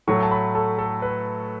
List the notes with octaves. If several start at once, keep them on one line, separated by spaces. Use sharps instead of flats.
A2 F#3 A3 C#6
A5
B5
A4
A4
B4